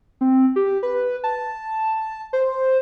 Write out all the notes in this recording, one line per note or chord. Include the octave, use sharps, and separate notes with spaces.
C4
G4
B4
A5
C5